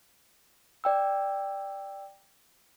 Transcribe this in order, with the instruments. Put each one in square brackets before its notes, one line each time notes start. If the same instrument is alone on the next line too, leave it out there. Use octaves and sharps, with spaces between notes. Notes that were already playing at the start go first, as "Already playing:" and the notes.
[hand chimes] D5 G5 E6